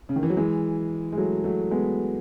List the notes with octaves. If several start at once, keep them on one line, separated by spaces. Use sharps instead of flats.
C#3
D#3
E3
F#3
E3 G#3
G#3
F#3 A3
F#3 A3
G#3 B3